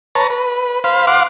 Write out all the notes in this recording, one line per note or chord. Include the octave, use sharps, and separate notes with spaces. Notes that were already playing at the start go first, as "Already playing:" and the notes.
B4 C#5 A5 A#5
B4
C5 F5 B5
F5 F#5 C6 D6